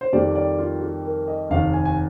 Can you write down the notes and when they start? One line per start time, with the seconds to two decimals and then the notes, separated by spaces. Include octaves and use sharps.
0.01 C5
0.12 F2 D#3 G3 A#3 D5
0.35 D5
0.59 F4
0.81 G4
1.05 A#4
1.28 D#5
1.50 F1 D#2 D#3 F5
1.74 G#5
1.85 G#5